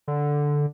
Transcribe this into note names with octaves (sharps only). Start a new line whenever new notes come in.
D3